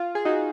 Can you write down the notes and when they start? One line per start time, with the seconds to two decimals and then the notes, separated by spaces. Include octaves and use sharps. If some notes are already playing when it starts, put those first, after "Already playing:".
Already playing: F4
0.15 G#4
0.25 D#4 F#4